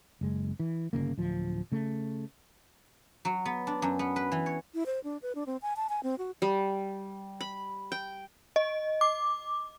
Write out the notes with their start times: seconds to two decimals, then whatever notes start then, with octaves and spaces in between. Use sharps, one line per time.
0.21 F#1 G#3
0.60 E3
0.93 G1 F2 C#3 A#3
1.18 D1 F3
1.72 C#3 A3
3.25 F#3
3.45 B3
3.67 D4
3.82 F#2
3.99 B3
4.16 B4
4.32 E3
4.46 C#5
4.74 E4
4.86 C5
5.04 D4
5.22 B4
5.35 D4
5.46 C4
5.62 G#5
5.76 A5
5.89 G#5
6.03 C4
6.18 F#4
6.42 G3
7.41 B5
7.92 G5
8.56 D#5
9.01 D6